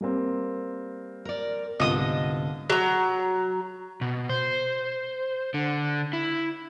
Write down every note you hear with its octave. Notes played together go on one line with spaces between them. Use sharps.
G3 A#3 C4
A#4 D5
C2 G#2 D3 B3 F4 D#5 D#6
F#3 A#5
B2
C5
D3
E4